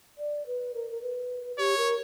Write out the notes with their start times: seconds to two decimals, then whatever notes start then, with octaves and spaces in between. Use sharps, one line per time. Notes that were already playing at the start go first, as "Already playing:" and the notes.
0.18 D5
0.46 B4
0.75 A#4
0.91 A#4
1.02 B4
1.58 G4 C#5
1.78 A#4